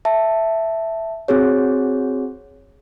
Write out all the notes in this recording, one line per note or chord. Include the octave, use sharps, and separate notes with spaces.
E5 A5
C4 F#4 G#4 C#5